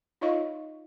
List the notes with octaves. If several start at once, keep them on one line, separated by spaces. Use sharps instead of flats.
D#4 F4 C#5 D#5 F5 C#6